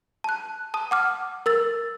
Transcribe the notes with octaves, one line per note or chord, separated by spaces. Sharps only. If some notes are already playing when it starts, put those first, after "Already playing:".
A5 F#6
A5 D#6
F#5 D6 F6
A#4 E6 A6